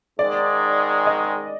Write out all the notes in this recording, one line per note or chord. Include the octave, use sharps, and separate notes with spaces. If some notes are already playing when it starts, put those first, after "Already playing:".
G#2 D#3 G#3 D5
D#5